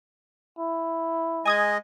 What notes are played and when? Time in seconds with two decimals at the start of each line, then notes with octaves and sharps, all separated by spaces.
0.59 E4
1.45 G#3 D#5 G#5 D#6 G#6